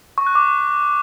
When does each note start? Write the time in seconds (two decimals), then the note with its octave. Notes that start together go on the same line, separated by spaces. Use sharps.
0.18 C#6
0.27 F#6
0.35 D6